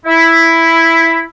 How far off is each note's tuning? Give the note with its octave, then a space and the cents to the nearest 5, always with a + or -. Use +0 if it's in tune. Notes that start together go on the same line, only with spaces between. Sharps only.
E4 +0